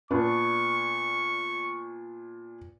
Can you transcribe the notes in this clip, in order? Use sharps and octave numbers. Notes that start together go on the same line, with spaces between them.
A#2 B3 D4 C#6